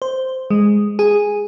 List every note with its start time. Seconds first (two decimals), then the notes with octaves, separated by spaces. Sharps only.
0.02 C5
0.50 G#3
0.99 G#4